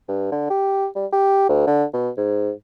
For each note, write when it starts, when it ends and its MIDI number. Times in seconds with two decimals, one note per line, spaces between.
0.08 0.30 43
0.32 0.46 50
0.50 0.87 67
0.95 1.06 55
1.12 1.48 67
1.49 1.66 38
1.67 1.84 50
1.93 2.10 47
2.17 2.51 44